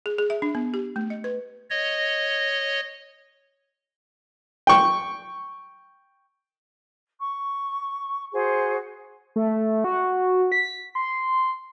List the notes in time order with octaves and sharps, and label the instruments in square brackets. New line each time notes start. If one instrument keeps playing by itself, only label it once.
[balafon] G#4
G#4
E5
D4
B3
G4
A3
D#5
B4
[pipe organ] C#5 D#5
[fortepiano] G5 C#6
[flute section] C#6
F#4 G#4 C5
[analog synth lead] A3
F#4
B6
C6